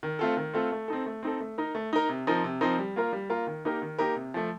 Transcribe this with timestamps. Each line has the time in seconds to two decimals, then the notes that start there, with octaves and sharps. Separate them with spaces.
0.03 D#3
0.19 A3 C4 F4 A4
0.37 D#3
0.54 A3 C4 F4 A4
0.72 A3
0.88 C4 D#4 A4
1.06 A3
1.23 C4 D#4 A4
1.40 A3
1.58 D#4 A#4
1.75 A3
1.93 D#4 A#4
2.09 C3
2.27 F3 C4 D#4 A#4
2.44 C3
2.61 F3 C4 D#4 A#4
2.79 G3
2.96 A#3 F4 A#4
3.13 G3
3.30 A#3 F4 A#4
3.47 D#3
3.65 A#3 D#4 G4 A#4
3.82 D#3
3.98 A#3 D#4 G4 A#4
4.16 C3
4.34 F3 A3